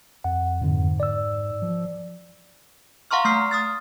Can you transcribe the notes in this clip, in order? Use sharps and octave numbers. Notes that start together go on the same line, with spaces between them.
F2 F#5
F2 G#2 D3
D5 E6
F3
F5 F#5 A#5 C6 C#6 F6
A3 C6 F6 C7
D#6 F6 A6